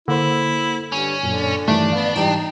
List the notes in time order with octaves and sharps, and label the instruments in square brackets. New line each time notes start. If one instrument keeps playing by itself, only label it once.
[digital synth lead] D3 [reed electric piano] A#3 C5 [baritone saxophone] E4
[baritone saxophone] G2 [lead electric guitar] C#4
[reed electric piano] F#2 A#2 [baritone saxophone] D3
[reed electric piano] G2 D#3 E3 [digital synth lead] A3 [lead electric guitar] D4
[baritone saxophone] B3 [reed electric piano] F5
[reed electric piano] G#2 E3 G3 [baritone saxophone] D#4 [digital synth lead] G5